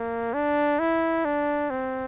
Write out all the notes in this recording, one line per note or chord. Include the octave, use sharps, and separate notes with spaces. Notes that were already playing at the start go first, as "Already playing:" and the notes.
Already playing: A#3
D4
E4
D4
C4